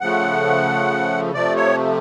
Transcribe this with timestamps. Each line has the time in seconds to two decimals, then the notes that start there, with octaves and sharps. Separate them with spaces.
0.01 C#3 F3 A3 F#5
1.34 C3 F3 A3 D5
1.56 C#5